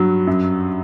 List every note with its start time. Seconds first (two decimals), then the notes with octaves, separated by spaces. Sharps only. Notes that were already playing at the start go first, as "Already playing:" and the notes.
Already playing: G2 F#3
0.27 F#2